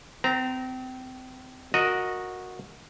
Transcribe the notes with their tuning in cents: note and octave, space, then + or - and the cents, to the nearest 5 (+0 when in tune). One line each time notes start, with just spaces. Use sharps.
C4 -30 A#5 +0
F#4 -10 A#4 +0 D#5 +0